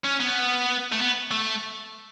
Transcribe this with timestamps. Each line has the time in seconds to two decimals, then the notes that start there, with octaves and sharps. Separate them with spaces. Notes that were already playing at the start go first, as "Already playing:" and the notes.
0.05 C#4
0.20 B3
0.92 A3
0.99 B3
1.31 A3